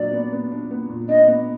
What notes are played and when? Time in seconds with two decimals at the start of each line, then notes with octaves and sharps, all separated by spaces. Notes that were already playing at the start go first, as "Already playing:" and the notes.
Already playing: A#2 F#3 D4 D5
0.13 B3
0.32 B3
0.52 D4
0.71 B3
0.90 A#2
1.09 D4 D#5
1.28 B3